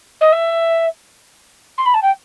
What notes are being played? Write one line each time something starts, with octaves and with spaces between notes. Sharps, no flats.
D#5
E5
C6
B5
A5
G5